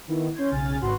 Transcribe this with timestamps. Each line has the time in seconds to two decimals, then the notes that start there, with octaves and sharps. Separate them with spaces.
0.08 D#3 B3 E4
0.35 C#4 C6 G6 G#6
0.51 B1 C#3 G#5 F6 A6
0.81 G#1 F#4 B4 C6 F#6